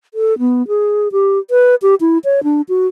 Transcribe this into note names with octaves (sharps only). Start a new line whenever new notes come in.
A4
B3
G#4
G4
B4
G4
E4
C#5
D4
F#4